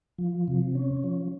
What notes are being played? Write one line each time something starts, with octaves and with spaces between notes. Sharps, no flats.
F3
C3
C#4
F3